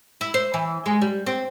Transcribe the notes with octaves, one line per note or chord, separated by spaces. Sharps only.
E4
C5
E3
G#3
G3
C4